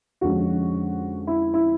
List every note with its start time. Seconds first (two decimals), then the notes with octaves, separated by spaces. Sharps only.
0.21 F2 D3 F3 G#3 C#4 F#4
1.27 E4
1.54 E4